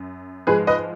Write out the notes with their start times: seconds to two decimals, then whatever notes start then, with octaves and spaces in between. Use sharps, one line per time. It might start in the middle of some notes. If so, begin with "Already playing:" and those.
Already playing: F#2
0.47 G#2 F3 G#3 G#4 B4
0.67 B4 D#5